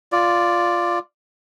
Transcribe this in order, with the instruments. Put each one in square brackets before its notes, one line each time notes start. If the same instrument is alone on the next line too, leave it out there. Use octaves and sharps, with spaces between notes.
[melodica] F4 D5